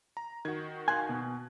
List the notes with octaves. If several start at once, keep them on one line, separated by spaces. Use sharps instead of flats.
A#5
D#3 F#4 G#6
F5 G#5 C6 F#6
B2